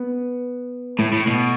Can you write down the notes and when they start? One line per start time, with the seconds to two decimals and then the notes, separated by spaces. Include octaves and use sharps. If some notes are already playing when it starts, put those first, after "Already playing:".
Already playing: B3
0.99 A2 A3
1.13 A2
1.27 B2